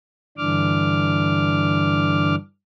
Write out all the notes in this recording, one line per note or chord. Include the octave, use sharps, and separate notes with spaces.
G2 D3 E3 D4 D6 F6